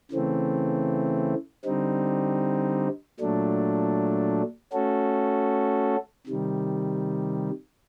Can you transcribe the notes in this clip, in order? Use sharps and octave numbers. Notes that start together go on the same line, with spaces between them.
C#3 E3 A3 C4
D3 G3 C4 D#4
A#2 F#3 A3 D4
A3 C#4 F#4 A4
C3 D#3 G3